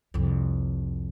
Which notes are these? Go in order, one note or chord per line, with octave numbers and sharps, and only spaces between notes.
C2 F2